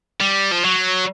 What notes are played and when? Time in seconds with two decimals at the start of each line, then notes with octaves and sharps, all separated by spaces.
0.21 G3
0.52 F3
0.64 F#3